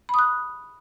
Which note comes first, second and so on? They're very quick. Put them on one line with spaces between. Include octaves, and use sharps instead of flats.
B5 D#6 F#6